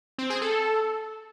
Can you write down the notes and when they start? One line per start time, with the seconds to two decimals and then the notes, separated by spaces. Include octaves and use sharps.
0.18 C4
0.30 G#4
0.42 A4